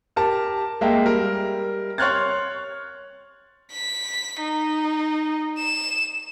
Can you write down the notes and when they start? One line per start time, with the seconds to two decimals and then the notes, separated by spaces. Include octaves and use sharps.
0.16 G4 A#4 A5
0.81 G#3 A#3 E5 G5
1.06 G3 A#4
1.98 C#5 C6 F6 F#6 G#6 A6
3.72 B6
4.41 D#4
5.58 E7